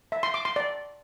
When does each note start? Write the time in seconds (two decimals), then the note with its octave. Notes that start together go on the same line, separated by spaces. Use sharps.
0.12 E5
0.23 C6
0.34 D6
0.45 C6
0.56 D5